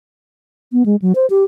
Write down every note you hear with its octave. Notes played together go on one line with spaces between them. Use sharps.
B3
G#3
F#3
C5
G4